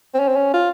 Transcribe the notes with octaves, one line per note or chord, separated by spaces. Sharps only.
C4
C#4
C4
C#4
F4